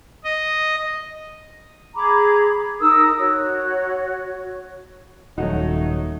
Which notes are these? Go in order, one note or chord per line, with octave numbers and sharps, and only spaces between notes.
D#5
G#4 A#5 B5 D6
D#4 A#4 D#6 E6
F#4 C#5
D#1 F#3 A3 D#4 F#4